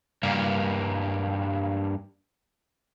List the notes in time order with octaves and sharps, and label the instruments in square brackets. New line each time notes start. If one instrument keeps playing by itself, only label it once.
[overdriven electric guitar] G2 A#3